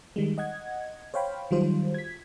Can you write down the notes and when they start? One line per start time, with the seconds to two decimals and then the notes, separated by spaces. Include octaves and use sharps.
0.16 D#3 G3 G#3
0.38 D#5 F#5 G#6
1.14 C5 C#5 F5 G5 B5
1.51 D#3 F#3 G3 F4 C5
1.94 G#6 B6